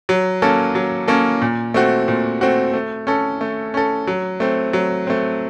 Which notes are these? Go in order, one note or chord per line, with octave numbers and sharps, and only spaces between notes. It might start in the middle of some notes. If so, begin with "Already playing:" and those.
F#3
A#3 C#4 A4
F#3
A#3 C#4 A4
A#2
A3 C4 F#4
A#2
A3 C4 F#4
A3
C#4 A4
A3
C#4 A4
F#3
A3 C4
F#3
A3 C4